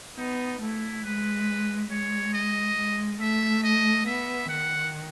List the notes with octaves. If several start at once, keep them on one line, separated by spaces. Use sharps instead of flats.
B3 D#4
A3 E4
G#3 B4
G#3 C#5
D#5
G#3
A3 E5
D#5
B3 E5
D#3 F#5